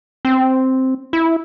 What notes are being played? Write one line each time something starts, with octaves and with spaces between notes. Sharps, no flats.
C4
E4